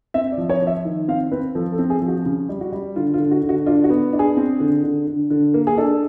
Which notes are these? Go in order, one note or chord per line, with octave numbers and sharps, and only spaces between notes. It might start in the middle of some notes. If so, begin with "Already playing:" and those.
C4 E5
D5
F3
C#5
F3
E5
D#3
C4 F5
C4 B4
F3 A4
A4
C4
G#4
F3
F#4
C#3
G3
F#4
G3
D3 F4
F4
D3
F#4
D3
F#4
D4 F4
F#4
B3
D4
G#4
C4
D3
D3
D3
D3
A#3
G#4
D4 A4